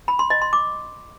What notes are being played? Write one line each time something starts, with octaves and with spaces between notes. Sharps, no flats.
B5
C6
D#5
C6
D6